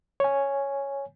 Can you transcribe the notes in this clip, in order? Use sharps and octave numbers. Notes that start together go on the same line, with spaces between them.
C#5 G#5